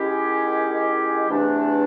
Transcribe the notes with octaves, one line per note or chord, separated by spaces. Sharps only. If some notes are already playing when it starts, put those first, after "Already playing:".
Already playing: D#3 G#3 C#4 E4 G4
E2 C3 E3 A3 D4